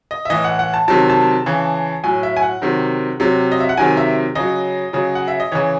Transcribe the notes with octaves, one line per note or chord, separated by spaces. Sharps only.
D#5
E5
A2 E3 D#5
F#5
F#5
A5
C3 D#3 F#3 A5
A5
C#3 E3
A2 F#3 G#5
E5
G#5
F#5
C3 D#3 F#3
C3 F#3
D#5
E5
F#5
C3 D#3 F#3 G#5
E5
C#3 F#3 D#5
C#3 F#3
F#5
E5
D#5
C#3 E3 C#5